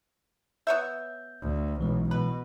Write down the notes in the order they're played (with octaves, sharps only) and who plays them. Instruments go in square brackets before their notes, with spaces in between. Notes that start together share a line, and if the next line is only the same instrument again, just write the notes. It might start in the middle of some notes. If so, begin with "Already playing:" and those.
[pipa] B3 C#5 E5 [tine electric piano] G6
[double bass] D2
[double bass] B1 [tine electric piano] E3 G#3
[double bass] B2 [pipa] B4